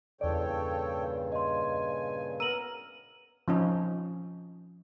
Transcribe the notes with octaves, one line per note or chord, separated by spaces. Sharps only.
E2 G2 A#2 C#3 A4 C#5 D5 G5
D#5 G#5 C6
B3 A#4 A#5 E6 D#7 F#7
F3 C#4 D#4